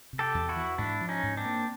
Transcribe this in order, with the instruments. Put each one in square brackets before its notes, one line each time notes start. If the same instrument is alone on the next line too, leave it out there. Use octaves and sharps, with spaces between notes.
[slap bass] C3
[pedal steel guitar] G4 A4
[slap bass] E2
[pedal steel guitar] E4 F#4
[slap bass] E3
[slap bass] G#2 [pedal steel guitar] D4 E4
[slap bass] F3
[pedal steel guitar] C#4 D#4
[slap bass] G#2
[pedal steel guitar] C4 D4
[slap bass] A#3